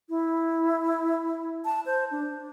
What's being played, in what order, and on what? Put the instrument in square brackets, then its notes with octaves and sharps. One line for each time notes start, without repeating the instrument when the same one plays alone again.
[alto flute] E4
A5
C5
D4